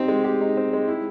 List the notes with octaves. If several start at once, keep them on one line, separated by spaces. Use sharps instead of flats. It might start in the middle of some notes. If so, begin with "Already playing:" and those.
Already playing: C4 D#4 G4
G#3
G4
D#4
C4
G#3
E4